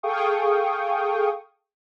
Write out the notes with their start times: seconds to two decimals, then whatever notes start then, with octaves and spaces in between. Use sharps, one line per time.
0.03 G#4 A4 F5 G5 C#6 D#6